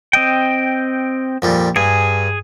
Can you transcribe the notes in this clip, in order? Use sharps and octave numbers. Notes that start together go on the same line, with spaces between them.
C4 D#5 G5
F2 A#2 G3
G2 G#4 G#5